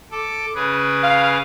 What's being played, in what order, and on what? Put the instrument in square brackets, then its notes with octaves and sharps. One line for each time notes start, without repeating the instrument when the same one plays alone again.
[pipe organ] A4 D6
C#3 G#4 B4
[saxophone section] F5